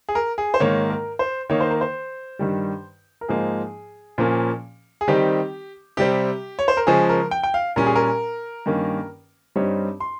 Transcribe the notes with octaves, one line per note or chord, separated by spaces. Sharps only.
G#4
A#4
G#4
C5
G#2 D#3 A#3 C#5
A#4
C5
D#3 A#3 D#4 C#5
C5
A#4
C5
G2 D#3 G3
A#4
G#2 F3 A#3 D#4 G#4
A#2 F3 A#3 C#4
G#4
D#3 G3 C4 D#4 G4
C3 G3 C4 G4
C#5
C5
A#4
C#3 F3 G#3 C#4 G#4
A#4
G5
G5
F5
A#2 G3 C#4 A#4
G#4
A#4
G2 D#3 A#3 C#4
G2 G3 C4 D#4 C#5
C6